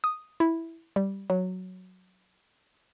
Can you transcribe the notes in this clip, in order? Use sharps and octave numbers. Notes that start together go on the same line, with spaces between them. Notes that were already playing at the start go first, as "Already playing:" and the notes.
D#6
E4
G3
F#3